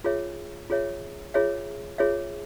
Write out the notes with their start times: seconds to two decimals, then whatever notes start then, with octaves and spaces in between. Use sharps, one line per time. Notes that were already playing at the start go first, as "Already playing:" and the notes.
0.04 F4 G#4 C#5 E5
0.70 F4 G#4 C#5 E5
1.34 F4 G#4 C#5 E5
1.98 F4 G#4 C#5 E5